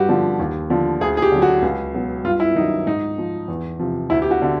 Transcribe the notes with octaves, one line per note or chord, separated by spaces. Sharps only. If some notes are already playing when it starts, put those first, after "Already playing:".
Already playing: G2 F#4 G4
D3 F3
D#2
D3 F3
D2 G#4
G#4
G4
D3 F#3
F#4
C#2
B2 F#3
G2 F4
E4
D#3 F#3 D#4
G#2 D#4
F3
E2
C3 F3
D2 E4
G4
F#4
D3